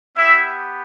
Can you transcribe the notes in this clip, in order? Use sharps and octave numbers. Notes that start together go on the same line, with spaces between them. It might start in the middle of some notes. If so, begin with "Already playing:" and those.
B3 E4 G4 E5